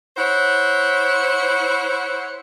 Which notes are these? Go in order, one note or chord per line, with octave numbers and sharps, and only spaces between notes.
E4 C5 C#5 F#5